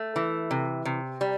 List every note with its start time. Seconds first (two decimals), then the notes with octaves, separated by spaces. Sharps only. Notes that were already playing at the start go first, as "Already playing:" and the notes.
Already playing: A3
0.16 E3
0.51 C3
0.85 C3
1.21 G3